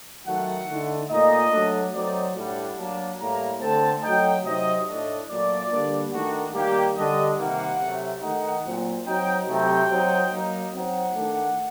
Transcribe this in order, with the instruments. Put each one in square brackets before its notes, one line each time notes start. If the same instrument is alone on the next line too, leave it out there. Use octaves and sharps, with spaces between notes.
[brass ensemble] D#3 F#3 A3 F#5
D3 A3 D#4
A#2 A3 D#4 D#5
F#3 A3 D4
F#3 A3 C4 D#4 D5
A2 G3 D4 F#5
F#3 A#3 D4 A5
A2 G3 A#3 A#5
D3 A3 C4 A5
F#3 A3 D#4 G5
C3 F#3 C4 D#4 D#5
A2 A3 D4 D#5
A#2 F#3 A3 D5
D3 G3 A#3 D4
D#3 A3 D4 F#4
D#3 G3 A#3 G4
D3 G3 D4 D#5
C3 D#3 G3 A#3 F#5
C3 F#3 A3
D#3 A3 D#4 F#5
A#2 F#3 C4
F#3 C4 D#4 G5
C3 F#3 A3 C4 D#4 G5
F#3 C4 D#4
F#3 A#3 D#4
F#3 C4 D#4 F#5
D#3 A3 D4